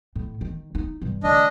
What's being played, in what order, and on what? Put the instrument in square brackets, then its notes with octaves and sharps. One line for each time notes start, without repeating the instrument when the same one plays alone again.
[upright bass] A2
D#3
D#4
G2 C3
[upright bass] D3 A3 [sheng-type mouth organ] D4 D#5